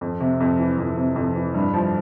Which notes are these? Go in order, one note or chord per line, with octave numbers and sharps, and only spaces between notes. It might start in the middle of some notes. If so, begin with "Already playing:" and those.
F2
C3
F2
E3
F2
C3
F2
E3
G2
F3